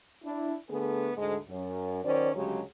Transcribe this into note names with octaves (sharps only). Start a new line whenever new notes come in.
D4 E4
D3 A3 B3 G#4
D2 G#2 G#3 A4
F#2
D#3 F#3 C#4 C5 D5
D2 C#3 F#3 G#3 G4